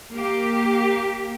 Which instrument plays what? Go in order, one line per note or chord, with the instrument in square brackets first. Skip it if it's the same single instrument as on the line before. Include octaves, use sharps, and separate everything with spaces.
[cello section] A#3 G4